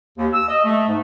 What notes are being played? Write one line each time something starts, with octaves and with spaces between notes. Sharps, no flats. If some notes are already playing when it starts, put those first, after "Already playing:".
D#2
E6
D#5
A3
G#2